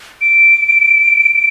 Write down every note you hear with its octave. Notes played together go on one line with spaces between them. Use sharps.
D7